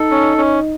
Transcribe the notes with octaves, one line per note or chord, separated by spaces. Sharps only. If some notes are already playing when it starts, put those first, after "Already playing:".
Already playing: D#4 A4
C#4
C#4